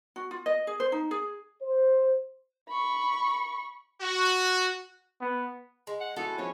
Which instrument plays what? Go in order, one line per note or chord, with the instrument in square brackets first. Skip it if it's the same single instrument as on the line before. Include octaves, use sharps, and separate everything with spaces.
[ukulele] F#4
F4
D#5
G#4
C5
D#4
G#4
[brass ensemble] C5
[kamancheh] B5 C#6
[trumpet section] F#4
[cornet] B3
[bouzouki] G#3
[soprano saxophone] F#5
[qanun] G#3 E4 F#4 [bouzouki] B3 [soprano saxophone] A4
[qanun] F3 C#4 G#4 [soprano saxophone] C#5